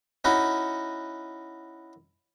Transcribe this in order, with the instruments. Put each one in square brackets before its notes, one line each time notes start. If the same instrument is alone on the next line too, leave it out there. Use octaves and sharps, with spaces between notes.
[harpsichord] C#4 D#4 E4 F#4